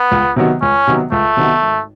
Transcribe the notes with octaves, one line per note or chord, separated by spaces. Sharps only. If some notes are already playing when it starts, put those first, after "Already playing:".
Already playing: B3
C#2
C3 D#3 F#3 B3
C#2 C#4
C3 D#3 F#3 B3
C#2 A3
C3 D#3 F#3 B3
G#1